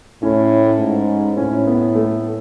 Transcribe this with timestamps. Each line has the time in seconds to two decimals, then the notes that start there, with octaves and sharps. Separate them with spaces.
0.22 A2 C#4
0.80 G#2
1.37 A2 C#4
1.67 B3
1.94 A3